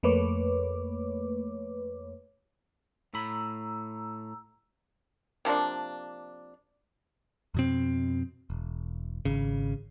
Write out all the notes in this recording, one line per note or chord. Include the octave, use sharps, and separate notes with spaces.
F2 A3 A#3 B4 C#5 D6
A2 A#5 B5 E6
C3 F3 A#3 D4
F2 B2 C4
E1
G#1 C#3